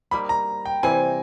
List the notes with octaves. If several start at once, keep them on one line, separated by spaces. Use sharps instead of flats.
G3 A#3 D#4 B5
A#5
G5
C3 E3 G3 C4 G#5